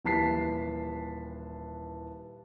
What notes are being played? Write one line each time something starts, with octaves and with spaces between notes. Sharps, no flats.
D#1 E3 A5 B6 C7